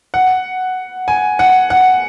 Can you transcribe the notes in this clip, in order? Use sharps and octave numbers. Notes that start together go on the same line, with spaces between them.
F#5
G#5
F#5
F#5